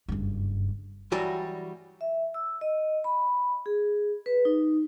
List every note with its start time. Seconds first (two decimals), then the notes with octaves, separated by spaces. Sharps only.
0.08 F#1 G2
1.12 E3 F#3 G3 F#4 D5
2.01 E5
2.34 E6
2.61 D#5
3.04 B5
3.66 G#4
4.26 B4
4.45 D#4